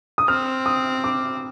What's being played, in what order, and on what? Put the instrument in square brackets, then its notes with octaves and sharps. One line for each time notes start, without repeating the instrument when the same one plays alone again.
[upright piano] D#6
[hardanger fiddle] C4 [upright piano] F6
[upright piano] D#6
D6